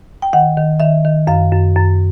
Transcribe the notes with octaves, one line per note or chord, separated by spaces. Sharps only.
G5
D#3 F#5
D#3
D#3 E5
D#3
F#2 F5
F#2
F#2